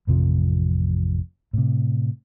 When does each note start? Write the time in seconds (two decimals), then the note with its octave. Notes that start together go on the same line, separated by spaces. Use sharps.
0.07 A1 F2 C3 F3
1.53 A2 C3